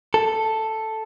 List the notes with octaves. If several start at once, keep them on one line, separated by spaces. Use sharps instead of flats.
A4